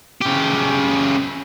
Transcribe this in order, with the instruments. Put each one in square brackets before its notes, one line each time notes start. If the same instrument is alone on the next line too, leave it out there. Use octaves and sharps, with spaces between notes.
[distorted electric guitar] C#3 G4